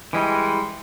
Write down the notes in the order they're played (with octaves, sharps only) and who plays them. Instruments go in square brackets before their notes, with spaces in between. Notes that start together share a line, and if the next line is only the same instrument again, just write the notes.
[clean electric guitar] E3 G3 [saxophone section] G#3